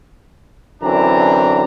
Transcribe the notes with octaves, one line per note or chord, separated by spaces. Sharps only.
F#2 D3 E3 C4 D4 A#5